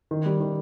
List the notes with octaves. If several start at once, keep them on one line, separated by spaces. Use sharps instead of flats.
D#3
G3
D#3